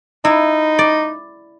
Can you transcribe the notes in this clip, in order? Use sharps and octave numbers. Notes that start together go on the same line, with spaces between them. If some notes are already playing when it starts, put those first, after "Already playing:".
D#4 E4
D5